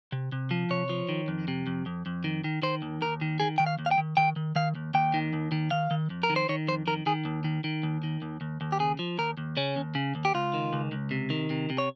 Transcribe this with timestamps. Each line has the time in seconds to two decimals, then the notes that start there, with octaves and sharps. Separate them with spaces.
0.12 C3
0.32 C3
0.51 F3
0.70 C3 C#5
0.89 F3
1.09 D#3
1.28 F2
1.48 C3
1.67 F2
1.86 F2
2.06 F2
2.24 D#3
2.44 D#3
2.62 D#3 C5
2.82 D#2
3.01 D#2 A#4
3.21 D#3
3.40 D#3 G#4
3.58 D#3 G5
3.66 F5
3.79 D#2
3.86 F5
3.91 G5
3.98 D#3
4.17 D#3 G5
4.36 D#3
4.56 D#3 F5
4.75 D#2
4.94 D#2 G5
5.14 D#3
5.33 D#2
5.52 D#3
5.71 D#3 F5
5.91 D#3
6.10 F2
6.23 A#4
6.30 D#3
6.36 C5
6.49 D#3 C#5
6.68 F2 C5
6.87 D#3 A#4
7.06 D#3 G#4
7.25 D#2
7.44 D#3
7.64 D#3
7.83 D#2
8.03 D#3
8.22 D#2
8.41 D#2
8.61 D#2
8.72 G4
8.79 C#3 G#4
8.99 F3
9.18 D#2 A#4
9.37 D#2
9.57 C#3 C#4
9.76 D#2
9.95 C#3
10.15 D#2
10.25 G4
10.34 C#2 F4
10.54 D#3
10.73 C#2
10.92 C#2
11.11 C3
11.30 D#3
11.50 C3
11.70 C3
11.78 C#5